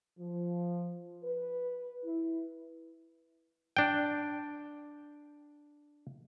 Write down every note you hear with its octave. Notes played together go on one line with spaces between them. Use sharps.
F3
B4
E4
D4 G5